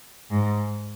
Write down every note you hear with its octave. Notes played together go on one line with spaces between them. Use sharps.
G#2